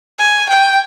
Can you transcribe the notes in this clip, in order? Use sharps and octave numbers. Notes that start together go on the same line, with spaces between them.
G#5
G5